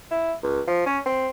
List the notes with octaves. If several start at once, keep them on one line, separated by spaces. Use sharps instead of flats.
E4
C#2
F3
C#4
C4